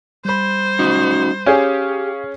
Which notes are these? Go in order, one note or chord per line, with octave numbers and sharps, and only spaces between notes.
G3 C5 B5
C#4 D#4 F#4
C#4 G4 G#4 F5